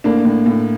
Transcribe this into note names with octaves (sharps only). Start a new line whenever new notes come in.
A2 A#3 D4
A2
A2